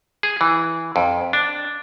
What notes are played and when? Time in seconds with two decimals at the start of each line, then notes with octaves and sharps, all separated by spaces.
0.23 G#4
0.41 E3
0.96 F2
1.33 D4